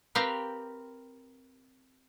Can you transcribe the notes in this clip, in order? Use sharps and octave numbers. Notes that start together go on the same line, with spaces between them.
C4 G4 A#4 B4 F5 G5